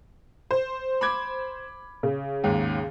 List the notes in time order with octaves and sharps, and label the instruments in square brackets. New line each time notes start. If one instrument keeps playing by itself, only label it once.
[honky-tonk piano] C5
[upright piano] B5 D6 G#6
[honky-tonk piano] C#3
[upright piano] D#2 G#2